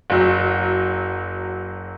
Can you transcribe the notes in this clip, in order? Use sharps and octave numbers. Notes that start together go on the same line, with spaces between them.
F#1 F#3